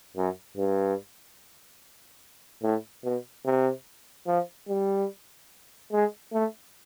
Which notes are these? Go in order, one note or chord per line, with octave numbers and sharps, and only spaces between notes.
F#2
G2
A2
B2
C3
F3
G3
G#3
A3